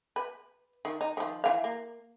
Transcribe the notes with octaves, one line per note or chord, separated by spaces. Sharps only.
B4
D#3
D#4
D#3 F3
E3 F5
A#3